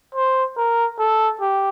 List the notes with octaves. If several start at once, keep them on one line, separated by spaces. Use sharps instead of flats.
C5
A#4
A4
G4